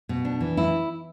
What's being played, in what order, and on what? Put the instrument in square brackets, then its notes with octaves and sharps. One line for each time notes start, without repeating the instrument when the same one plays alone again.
[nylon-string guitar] B2
D4
E3
E4